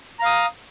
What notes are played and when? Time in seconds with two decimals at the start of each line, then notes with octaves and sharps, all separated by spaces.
0.19 A#5
0.22 F5
0.26 D#6